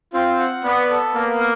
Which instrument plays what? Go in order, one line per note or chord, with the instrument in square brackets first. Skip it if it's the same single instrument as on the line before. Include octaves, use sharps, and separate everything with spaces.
[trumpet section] C4 [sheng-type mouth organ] F4
[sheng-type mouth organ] F#5
[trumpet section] B3 [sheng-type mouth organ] D5
[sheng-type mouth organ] A4
[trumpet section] A#3 [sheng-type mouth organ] B3
[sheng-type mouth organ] A#4